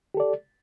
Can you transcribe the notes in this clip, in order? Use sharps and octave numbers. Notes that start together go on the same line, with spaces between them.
G4 A4 D5